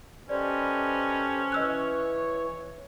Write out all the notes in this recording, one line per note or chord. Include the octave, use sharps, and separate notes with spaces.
C#4 G4 A4 B4 C5 D5 D#5
E3 C#5 D#5 E6 F#6